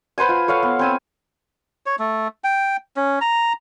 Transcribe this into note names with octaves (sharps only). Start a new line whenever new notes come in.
B4 C5 F#5 G#5
F4
A4 C#5 F5 F#5
B3
C4 G#5 E6
C#5
A3
G5
C#4
A#5